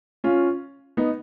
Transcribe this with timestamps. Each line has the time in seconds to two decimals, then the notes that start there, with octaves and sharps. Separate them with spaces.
0.24 C#4 F4
0.97 B3 D#4